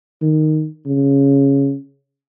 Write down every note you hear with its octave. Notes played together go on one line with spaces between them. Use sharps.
D#3
C#3